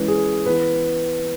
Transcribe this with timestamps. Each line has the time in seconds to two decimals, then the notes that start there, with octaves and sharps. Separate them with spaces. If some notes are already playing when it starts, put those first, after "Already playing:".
Already playing: E3 G#3 C#4 B4
0.08 G#4
0.46 E3 B3 B4